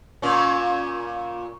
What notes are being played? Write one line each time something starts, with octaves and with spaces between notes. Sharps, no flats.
A#2 C#4